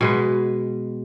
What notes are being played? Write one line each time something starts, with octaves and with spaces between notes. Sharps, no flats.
B2 G#3 B4